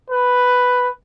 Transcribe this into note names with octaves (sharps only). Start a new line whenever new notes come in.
B4